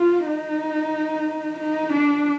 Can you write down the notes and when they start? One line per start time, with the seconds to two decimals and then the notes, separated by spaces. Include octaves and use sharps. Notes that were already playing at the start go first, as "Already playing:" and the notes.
Already playing: F4
0.26 D#4
1.59 D#4
1.93 D4